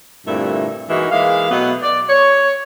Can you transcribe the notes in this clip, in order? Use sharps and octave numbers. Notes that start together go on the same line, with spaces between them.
G2 A#2 D3 A3 C4 E4
E3 G#3 A#3 D#4 E4 F#4
E3 G#3 A#3 F5
B2 F#3 A3 B3
D5
C#5